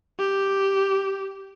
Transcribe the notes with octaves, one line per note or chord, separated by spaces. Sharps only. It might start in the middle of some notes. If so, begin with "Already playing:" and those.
G4